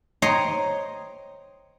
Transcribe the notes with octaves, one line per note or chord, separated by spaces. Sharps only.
C5 C#5 D#5 G5 A#5 C6